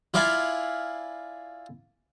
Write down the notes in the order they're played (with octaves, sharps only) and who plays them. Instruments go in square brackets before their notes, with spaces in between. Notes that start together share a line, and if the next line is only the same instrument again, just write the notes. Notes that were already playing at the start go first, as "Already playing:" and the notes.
[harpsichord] E4 F4 D5 F5 G#5 B5